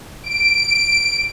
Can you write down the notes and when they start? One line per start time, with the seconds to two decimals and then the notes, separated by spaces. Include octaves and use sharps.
0.23 D7